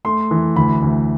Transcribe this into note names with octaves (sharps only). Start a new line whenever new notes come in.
A3 C6
E3
D2 B5
D2